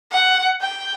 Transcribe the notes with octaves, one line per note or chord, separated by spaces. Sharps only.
F#5
G5